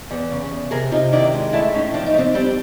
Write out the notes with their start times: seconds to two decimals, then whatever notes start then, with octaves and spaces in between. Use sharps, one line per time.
0.11 E2
0.31 C#3
0.51 E2
0.71 C3 G#4 A#4
0.91 C3 D#4 F4
1.12 D#3 D4 E4
1.33 G#3
1.53 A3 D4 E4
1.73 A2 C#4 D#4
1.94 F3 D4
2.06 D#4
2.14 A3
2.18 C4 D4
2.34 G3 C4 D4